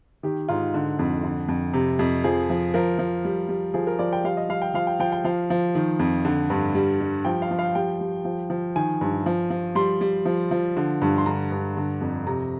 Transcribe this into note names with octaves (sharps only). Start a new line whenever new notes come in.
D#3 G4
G#2 F4
D3
F2
D3
F2
C3
F2
F3 G#4
F3
F3 A#4
F3
G3
G3
F3 G#4
A#4
F3 D5
G5
G3 F5
D#5
G3 F5
G5
F3 F5
G5
F3 G5
G5
F3 F5
F3
D#3
F2
D3
G2
G3
G3
F3 G5
F5
F3
F5
G3 G5
G3
F3
F3
D#3 G#5
G2
F3
F3
G3 C6
G3
F3
F3
D3
G2
C6
D3 A#5
G2
D3
F2
C3 A#5